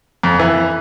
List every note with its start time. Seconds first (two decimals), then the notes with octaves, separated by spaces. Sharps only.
0.23 F2
0.39 E3